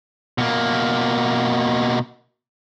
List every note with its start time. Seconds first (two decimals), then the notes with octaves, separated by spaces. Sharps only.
0.38 B2 A#3